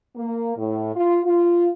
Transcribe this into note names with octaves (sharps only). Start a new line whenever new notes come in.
A#3
A2
F4
F4